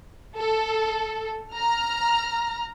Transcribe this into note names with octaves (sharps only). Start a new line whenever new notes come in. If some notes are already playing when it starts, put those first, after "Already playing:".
A4
A#5 F6